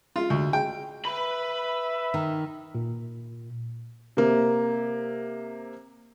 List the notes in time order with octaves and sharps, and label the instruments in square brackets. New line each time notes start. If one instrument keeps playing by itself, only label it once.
[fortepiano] F4
D2
G5
[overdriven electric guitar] B4 B5 [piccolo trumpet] E5
[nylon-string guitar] D#3
[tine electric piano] A#2
[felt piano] C3 A#3